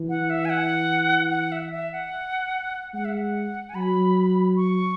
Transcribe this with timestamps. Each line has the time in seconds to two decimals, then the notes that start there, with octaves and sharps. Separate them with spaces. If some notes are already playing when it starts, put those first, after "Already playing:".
Already playing: E3
0.09 F#5
0.30 E5
0.45 G#5
0.50 F#5
1.31 F#5
1.52 E5
1.72 E5
1.92 F#5
2.93 G#3 F#5
3.05 E5
3.15 F#5
3.69 G#5
3.75 F#3 B5
4.56 C#6